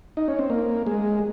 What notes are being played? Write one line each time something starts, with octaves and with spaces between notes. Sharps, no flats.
D#4
C#4
C4
A#3
G#3